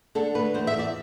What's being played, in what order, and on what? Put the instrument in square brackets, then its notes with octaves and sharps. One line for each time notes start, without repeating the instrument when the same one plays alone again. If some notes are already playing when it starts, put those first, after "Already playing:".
[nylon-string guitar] D3 A4
A3 B4
E2 C5
E5
E2
D5